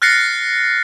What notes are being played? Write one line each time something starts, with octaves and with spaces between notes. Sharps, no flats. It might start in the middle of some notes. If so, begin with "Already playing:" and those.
F6 F#6 A6 A#6 C7 C#7